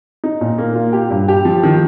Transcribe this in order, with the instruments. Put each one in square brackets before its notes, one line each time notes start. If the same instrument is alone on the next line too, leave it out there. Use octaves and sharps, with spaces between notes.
[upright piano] D#4
A#2
A#3
F4
G4
G2
G4
F3
D#3